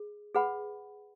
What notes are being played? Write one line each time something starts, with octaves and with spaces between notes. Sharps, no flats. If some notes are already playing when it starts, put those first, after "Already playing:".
Already playing: G#4
G#4 B4 F#5 B5